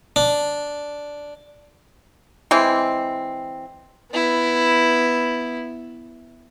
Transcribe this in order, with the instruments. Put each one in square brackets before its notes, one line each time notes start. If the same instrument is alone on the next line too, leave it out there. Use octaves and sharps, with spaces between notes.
[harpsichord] D4
[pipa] E3 G#3 C4
[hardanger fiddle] B3 E4